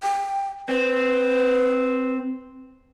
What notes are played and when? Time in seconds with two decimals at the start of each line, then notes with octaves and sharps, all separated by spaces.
0.03 G5
0.69 C4 B4